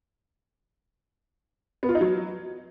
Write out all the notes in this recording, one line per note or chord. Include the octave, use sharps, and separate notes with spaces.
B3
F4
D#4
F#3